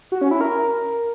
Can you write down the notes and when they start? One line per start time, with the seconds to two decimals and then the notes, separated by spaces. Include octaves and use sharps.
0.12 F#4
0.21 C#4
0.31 E4
0.41 A#4